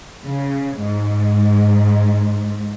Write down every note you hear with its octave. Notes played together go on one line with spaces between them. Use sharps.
C#3
G#2